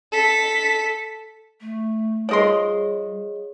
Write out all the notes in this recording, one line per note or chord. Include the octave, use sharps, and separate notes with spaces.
A4 B6
A3
F3 G3 G#4 C#5 D#5 C6